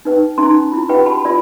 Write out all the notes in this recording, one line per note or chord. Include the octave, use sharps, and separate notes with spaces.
D#4 B4 G5
C#4 D#4 A#5 C6
E4 F4
F4 G4 B4 F#5 G5
F#4 A5 B5
F4 D5 B5